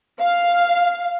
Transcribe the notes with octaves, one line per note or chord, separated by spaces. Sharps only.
F5